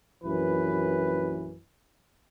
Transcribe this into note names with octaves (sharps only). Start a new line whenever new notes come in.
A#1 F#2 E3 B4